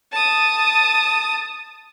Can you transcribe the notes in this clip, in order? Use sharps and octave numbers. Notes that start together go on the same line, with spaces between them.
A5 D#6